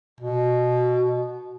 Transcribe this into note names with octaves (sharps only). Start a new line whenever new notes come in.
B2